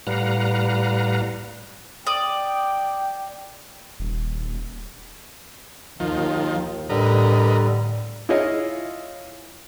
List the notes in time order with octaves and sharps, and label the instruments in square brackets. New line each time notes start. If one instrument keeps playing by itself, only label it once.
[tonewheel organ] A2 G3 B4 F5 F#5 A#5
[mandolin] D5 D#6 [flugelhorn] G5
[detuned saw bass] D#1
[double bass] D#2 [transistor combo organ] D#3 F3
[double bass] A2 [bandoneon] D3 G3 [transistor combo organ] A#4 B4 D#5
[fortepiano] E4 F4 G#4 C#5 D#5 F5